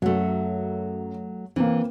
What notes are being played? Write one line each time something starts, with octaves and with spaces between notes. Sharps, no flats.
F#2 F#3 A3
E3 A#3 C4